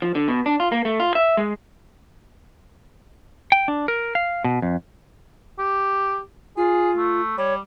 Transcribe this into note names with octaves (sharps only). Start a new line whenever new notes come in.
F3
D3
B2
D4
F4
A#3
A3
F4
E5
G#3
G5
D4
A#4
F5
B2
F2
G4
F4 G#4
A3
G3 C#5